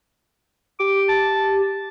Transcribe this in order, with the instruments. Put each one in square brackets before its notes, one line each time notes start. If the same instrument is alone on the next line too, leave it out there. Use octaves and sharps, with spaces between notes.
[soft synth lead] G4 [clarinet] D6
[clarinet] A5